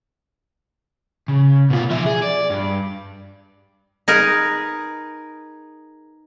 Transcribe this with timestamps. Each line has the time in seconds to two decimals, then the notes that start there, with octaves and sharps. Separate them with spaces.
1.28 C#3
1.70 B2 F4
1.90 F3 E5
2.06 G#4
2.22 D5
2.50 G2
4.08 D#4 G#4 A#4 B4